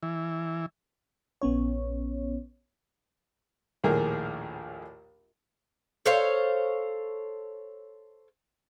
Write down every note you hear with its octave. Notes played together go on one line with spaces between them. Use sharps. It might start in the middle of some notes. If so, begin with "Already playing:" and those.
E3
A#1 B3 C#4 C#5
A#1 D#2 A2 G#4 A#4
A4 C5 C#5 F5